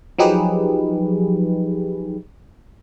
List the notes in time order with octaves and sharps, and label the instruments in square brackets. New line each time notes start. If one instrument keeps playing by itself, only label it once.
[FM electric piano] F3 F#3 D#4 G4 G#4 B4